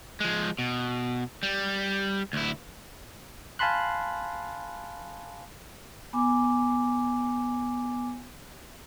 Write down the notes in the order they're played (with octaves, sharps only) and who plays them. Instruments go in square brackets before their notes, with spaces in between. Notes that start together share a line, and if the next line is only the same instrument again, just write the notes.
[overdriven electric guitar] F3 G#3
B2
G3
D2 E4
[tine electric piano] F5 G#5 A5 B5 C6 F#6
[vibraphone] B3 G#5 D6